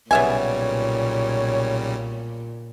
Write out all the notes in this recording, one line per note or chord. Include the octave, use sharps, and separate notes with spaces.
B1 A#2 C#3 G3 B3 C#5 E5 G#5